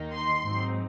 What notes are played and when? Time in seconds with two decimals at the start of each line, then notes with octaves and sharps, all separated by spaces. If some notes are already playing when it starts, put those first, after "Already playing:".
Already playing: D#2 D#3 A#3 D#4
0.12 C6
0.43 G#2 F#3 C4 D#4